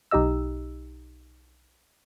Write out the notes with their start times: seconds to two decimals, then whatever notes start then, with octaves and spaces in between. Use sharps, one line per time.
0.11 B1 D#4 G4 D#5 E6